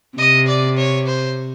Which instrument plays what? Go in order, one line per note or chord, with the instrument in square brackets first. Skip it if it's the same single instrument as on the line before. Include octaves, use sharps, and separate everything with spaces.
[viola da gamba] C3 [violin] D#5
[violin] D5
C#5
C5